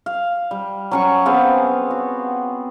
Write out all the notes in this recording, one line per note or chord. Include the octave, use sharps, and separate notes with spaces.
F5
G3
F#3 C#4 C#6
B3 C4 G#4 F5
F#4